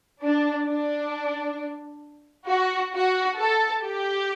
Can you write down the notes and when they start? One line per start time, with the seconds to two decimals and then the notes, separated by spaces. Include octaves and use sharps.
0.21 D4
0.67 D4
2.47 F#4
2.93 F#4
3.38 A4
3.83 G4